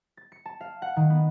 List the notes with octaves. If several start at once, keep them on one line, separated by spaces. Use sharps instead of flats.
A6
C#7
A5
F5
F#5
D#3
B3